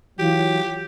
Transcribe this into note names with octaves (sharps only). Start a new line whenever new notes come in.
E3 F#3 F4 G4